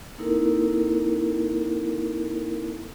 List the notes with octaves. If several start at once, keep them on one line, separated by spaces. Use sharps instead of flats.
A#3 C4 D#4 E4 A4 A#4